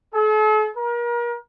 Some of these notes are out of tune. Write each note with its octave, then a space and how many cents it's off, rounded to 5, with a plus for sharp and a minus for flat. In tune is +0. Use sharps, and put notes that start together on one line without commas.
A4 -45
A#4 +35